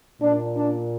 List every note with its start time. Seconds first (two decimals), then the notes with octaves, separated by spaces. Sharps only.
0.21 A#2 D4
0.56 D4